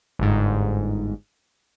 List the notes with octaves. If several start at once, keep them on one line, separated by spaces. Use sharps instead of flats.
G1 G#2